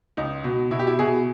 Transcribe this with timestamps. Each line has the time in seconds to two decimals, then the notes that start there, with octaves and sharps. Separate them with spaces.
0.17 C#2 D#4
0.44 B2
0.71 B2 E4
0.79 G4
0.87 E4
0.99 B2 G#4